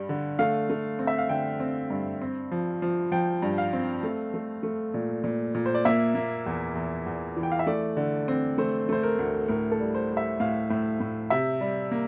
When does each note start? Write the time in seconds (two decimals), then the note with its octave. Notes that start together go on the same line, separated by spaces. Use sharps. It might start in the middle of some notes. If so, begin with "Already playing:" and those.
Already playing: G2 G3
0.09 D3
0.39 A3 F5
0.69 A3
0.99 C4
1.07 E5
1.18 F5
1.29 D3 G5
1.60 C4
1.90 G2
2.22 C4
2.51 F3
2.82 F3
3.12 F3 G5
3.42 G2
3.58 F5
3.73 C4
4.03 A3
4.34 A3
4.63 A3
4.94 A#2
5.24 A#2
5.55 A#2
5.66 C5
5.74 D5
5.85 A#3 E5
6.15 A#3
6.46 E2
6.75 E2
7.06 E2
7.37 E3
7.43 G5
7.52 F5
7.59 E5
7.66 A3 D5
7.97 D3
8.28 C4
8.58 A3 C5
8.89 A3 C5
9.03 A#4
9.19 D2
9.48 A2 A#4
9.71 A4
9.80 G3
9.94 C5
10.09 G3
10.17 E5
10.40 A2 F5
10.70 A2
11.00 A2
11.30 C3 E5
11.61 G3
11.91 A#3